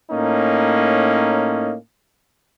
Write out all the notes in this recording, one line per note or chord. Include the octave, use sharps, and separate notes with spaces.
A2 A#3 C#4 D#4